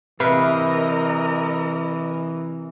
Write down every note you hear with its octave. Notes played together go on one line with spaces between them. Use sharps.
C3 E3 A#4 B4 D#5 F5